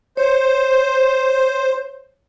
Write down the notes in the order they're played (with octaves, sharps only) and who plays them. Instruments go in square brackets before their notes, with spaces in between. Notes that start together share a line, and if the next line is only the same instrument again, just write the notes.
[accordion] C5 [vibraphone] C#5